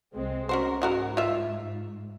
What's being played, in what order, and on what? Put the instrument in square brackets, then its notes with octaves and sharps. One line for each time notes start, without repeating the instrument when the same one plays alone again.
[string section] C2 G#3 C4
[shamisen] C#4 F#4 C5 [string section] A#4
[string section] G#2 [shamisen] E3 F#4 A#4
[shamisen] F4 E5